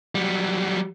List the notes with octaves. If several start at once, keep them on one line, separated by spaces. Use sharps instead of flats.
F#3 G3